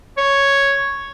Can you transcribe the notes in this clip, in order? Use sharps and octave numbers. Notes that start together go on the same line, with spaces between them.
C#5